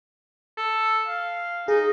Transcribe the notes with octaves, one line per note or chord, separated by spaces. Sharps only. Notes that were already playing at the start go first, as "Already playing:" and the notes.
A4
F5
D#4 G#4